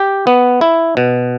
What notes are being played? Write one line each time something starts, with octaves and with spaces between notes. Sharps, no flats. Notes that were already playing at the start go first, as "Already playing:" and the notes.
Already playing: G4
B3
E4
B2